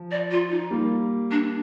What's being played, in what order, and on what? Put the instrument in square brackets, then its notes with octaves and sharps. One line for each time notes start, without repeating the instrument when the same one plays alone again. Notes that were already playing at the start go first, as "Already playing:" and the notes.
Already playing: [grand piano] F3
[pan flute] D5
F4
D#4
[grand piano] G3 A#3
[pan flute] D4